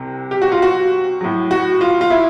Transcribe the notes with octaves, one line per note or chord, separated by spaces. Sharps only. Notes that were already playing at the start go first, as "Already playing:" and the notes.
Already playing: C2 C3
G4
F#4
F4
F#4
A2 F#3
F#4
F4
F4
E4